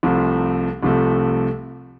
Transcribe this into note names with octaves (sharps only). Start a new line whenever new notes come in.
C2 C3 F3 A3
C2 C3 F3 A3